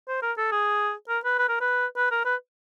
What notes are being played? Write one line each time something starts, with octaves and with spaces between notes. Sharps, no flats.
C5
A#4
A4
G#4
A#4
B4
B4
A#4
B4
B4
A#4
B4